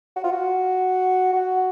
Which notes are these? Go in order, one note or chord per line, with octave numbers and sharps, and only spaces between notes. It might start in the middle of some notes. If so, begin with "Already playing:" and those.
F#4
F4
F#4
F#4